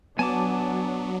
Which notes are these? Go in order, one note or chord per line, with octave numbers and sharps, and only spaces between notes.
F#3 B3 D4 G#5 A5 D6